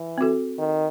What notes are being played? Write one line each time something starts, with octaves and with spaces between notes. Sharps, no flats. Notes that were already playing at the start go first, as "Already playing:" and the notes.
Already playing: E3
C4 F#4 A4
D#3